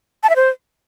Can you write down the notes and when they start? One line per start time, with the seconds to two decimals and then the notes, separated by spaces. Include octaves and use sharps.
0.23 A5
0.30 E5
0.36 C5